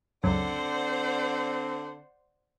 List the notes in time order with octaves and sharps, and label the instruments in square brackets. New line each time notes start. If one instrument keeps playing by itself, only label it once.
[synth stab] C#2 F#2 [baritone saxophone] D3 [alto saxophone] C4 [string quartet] C5 D5 F#5